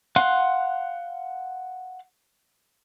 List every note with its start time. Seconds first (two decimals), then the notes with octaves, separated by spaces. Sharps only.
0.16 F5 F#5 C6 F#6